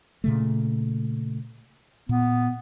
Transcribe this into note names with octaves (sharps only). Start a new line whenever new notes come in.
A#2 C#3 A3
A#2 B3